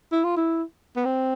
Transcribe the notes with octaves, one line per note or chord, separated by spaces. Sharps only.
E4
F4
E4
B3
C4